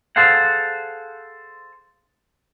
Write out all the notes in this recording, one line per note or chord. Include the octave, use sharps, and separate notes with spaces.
G#4 A4 C5 F5 F#5